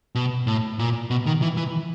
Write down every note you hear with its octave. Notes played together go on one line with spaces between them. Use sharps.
B2
A2
A#2
B2
D#3
E3
E3